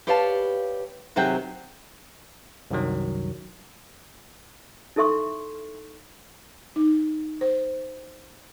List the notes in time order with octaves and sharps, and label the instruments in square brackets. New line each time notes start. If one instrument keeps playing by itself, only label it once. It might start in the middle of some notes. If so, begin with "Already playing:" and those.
[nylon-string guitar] G4 B4 C#5 D5 F5 A5
D#2 C3 F#3 G#4 F#5 G5
[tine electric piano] C2 F#2 D#3 F#3
[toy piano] D#4 E4 A4 E5 C6 C#6
[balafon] D#4
C5